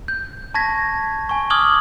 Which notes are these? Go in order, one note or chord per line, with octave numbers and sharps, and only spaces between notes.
G6
A5 C#6 G#6 A#6 B6
G#5 C#6
D6 D#6 F6 G#6 F#7 G7